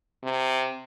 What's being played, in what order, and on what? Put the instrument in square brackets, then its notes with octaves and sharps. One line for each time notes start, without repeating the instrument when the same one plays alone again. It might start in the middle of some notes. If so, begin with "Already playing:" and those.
[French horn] C3